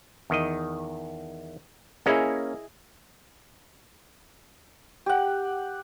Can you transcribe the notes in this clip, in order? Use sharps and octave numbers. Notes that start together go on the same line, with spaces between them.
E2 D#3 D#5
A#3 C#4 E4 G#4 D#5
G4 F#5